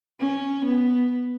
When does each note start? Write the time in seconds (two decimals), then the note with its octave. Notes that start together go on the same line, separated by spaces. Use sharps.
0.20 C#4
0.65 B3